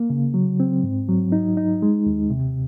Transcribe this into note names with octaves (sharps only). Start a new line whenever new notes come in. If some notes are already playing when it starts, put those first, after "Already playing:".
Already playing: A#3
C#3
F#3
C4
G#2
F#3
D#4
D#4
G#3
D#2
C3